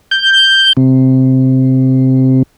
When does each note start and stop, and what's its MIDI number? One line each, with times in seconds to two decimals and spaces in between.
0.11 0.73 91
0.77 2.43 48